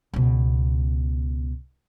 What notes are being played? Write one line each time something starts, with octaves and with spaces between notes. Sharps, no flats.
C#2 B2